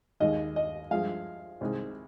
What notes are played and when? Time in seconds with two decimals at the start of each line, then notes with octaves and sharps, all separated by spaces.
0.20 D#2 D#3 G#3 D#5
0.56 D#5
0.91 G2 F3 G#3 F5
1.61 C2 C3 D#3 G#3